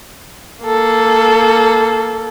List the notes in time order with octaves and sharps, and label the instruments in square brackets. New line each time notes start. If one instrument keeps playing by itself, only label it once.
[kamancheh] A#3 A4